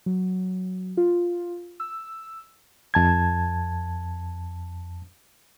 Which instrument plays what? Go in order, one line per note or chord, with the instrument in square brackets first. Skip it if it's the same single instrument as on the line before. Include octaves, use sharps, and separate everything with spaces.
[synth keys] F#3
F4
E6
[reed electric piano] F2 A5 G#6